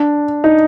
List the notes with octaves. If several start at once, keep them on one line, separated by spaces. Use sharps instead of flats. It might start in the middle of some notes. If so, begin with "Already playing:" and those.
Already playing: D4
D#4